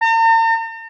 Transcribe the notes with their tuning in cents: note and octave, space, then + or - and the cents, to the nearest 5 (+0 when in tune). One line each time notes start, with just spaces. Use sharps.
A#5 -45